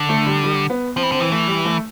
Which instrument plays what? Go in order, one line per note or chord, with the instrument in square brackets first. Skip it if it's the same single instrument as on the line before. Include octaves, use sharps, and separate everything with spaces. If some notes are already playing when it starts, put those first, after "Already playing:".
Already playing: [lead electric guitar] D3
[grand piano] A3
G3
G3
B3
[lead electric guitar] F3 [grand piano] C4
[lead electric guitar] E3
[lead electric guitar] D3 [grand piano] C4
[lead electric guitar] E3
[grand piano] A3
G3
A3